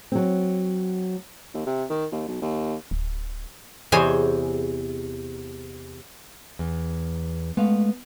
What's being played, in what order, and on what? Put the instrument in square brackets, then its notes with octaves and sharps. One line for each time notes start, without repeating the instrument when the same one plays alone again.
[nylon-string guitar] F#3 C4
[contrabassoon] D#2
C3
D#3
D#2
B1
D#2
[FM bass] D1
[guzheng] E2 C3 G#4 C5 C#5 G#5
[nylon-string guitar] E2
[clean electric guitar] G#3 A3 F5 [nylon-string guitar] B3